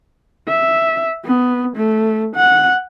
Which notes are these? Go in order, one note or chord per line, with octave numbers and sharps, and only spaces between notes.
E5
B3
A3
F#5